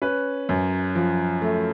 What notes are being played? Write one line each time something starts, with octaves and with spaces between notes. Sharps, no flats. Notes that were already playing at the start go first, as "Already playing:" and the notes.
C#4 B4
F#2
F3
A3